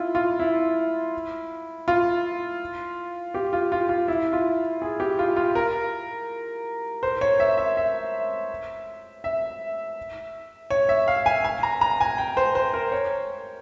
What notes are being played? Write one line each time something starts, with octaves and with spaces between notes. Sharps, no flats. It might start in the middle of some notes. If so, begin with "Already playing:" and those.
Already playing: E4 F4
F4
E4
F4
G4
F4
F4
F4
E4
F4
G#4
G4
F4
F4
A#4
C5
C#5
E5
E5
E5
E5
C#5
E5
F5
G#5
G#5
A#5
A#5
G#5
G5
C5
C5
A#4
C#5